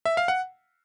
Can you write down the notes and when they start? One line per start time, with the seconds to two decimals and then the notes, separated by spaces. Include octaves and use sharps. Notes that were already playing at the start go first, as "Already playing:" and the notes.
0.06 E5
0.17 F5
0.28 F#5